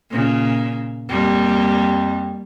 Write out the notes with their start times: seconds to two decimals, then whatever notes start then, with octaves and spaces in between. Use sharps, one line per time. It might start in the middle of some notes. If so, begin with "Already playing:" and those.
0.10 A#2 C#3
1.09 F2 G3 A#3